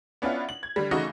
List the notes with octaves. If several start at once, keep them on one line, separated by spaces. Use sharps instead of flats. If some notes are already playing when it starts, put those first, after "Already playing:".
B3 C#4 D4 E4 F4 F#5
F#7
G#6
D3 G3
C#3 E3 A3 D#4 F#4